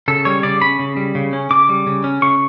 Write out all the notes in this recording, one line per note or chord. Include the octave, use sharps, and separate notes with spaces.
C#3 A4
G3 C#5
C#3 D5
C#4 B5
C#3
G3
C#3
C#4
C#3 D6
G3
C#3
C#4
C#3 C#6